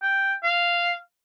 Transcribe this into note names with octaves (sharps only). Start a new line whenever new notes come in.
G5
F5